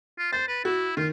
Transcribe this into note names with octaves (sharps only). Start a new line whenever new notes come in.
F4
C5 A6
B4
E4 F#4
D#3 F4